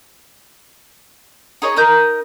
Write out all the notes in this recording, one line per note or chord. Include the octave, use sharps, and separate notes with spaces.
D#4 G#4 C#5 D#5
D#4 A#4 D#5 G6